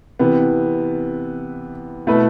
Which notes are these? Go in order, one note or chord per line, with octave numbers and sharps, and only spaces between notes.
C3 E3 B3
B2 A3 E4 B4